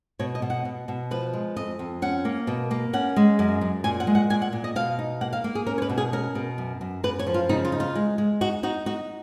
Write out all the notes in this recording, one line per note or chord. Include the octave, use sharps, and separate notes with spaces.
B2 C#5
D#5
B2
F#5
B2
B2
F3 B4
G#3
F2 D#5
F2
C#4 F#5
A#3
B2
A#3
C#4 F#5
G#3
F#2
F#2
A#2 G#5
F#5
G#3
F#5
A#2 G#5
F#5
A#2
D#5
B2 F5
D#4
A#3 F#5
F5
A#3
G#4
C#4 A#4
C#5
B4
B2
G#4
C#4 A#4
B2
F#2
F#2
F#2 B4
C#5
F3
F4
C#3 D#4
F4
D#4
F4
G#3
G#3
D#4 F#4
D#4 F#4
D#4 F#4